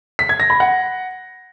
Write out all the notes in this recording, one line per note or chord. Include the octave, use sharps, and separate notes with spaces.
B6
G#6
A#6
B5
F#5